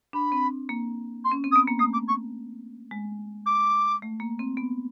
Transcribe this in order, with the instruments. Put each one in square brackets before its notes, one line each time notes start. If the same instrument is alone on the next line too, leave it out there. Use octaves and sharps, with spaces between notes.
[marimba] D4 [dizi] B5
[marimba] C4
A#3
[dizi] C6
[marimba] C#4
C4
[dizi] D#6
[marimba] B3
A#3
[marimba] A3 [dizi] D#6
[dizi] D6
C#6
[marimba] G#3
[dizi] D6
[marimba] A3
A#3
C4
B3